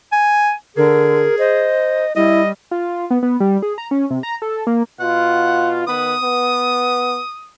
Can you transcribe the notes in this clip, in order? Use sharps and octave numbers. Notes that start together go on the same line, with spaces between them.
G#5
D3 G#4 A#4
C5 D#5
G3 E4 D#5
F4
B3
B3
G3
G#4
A#5
C#4
C3
A#5
A4
A#3
B2 F4 F#5
D#3 B3 B4 D#6
B3